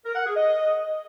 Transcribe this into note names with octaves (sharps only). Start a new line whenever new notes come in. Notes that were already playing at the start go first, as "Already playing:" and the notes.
A#4
F#5
G#4
D#5